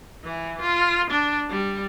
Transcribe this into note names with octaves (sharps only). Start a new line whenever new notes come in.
E3
F4
D4
G3